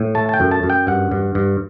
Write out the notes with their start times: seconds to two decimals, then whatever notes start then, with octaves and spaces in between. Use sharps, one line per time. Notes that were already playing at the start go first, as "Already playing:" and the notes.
Already playing: A2
0.15 A3 A5
0.29 A5
0.34 G5
0.40 F#2
0.51 A5
0.63 F#2
0.70 G5
0.87 G2 F#5
1.12 G2
1.35 G2